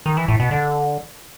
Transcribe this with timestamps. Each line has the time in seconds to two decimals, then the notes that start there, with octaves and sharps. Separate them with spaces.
0.06 D#3
0.17 E3
0.28 A2
0.40 B2
0.51 D3